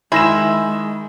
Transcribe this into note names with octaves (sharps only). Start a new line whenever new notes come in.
D#3 G#3 E4 E5 G#5 C6 A#6 E7